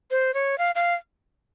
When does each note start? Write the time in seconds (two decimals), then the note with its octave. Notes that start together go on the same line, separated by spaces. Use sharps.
0.11 C5
0.34 C#5
0.58 F5
0.75 F5